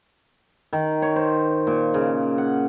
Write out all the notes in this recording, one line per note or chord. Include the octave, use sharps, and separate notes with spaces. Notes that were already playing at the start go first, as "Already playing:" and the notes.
D#3
C#5
C5
A#2
C#3
F#5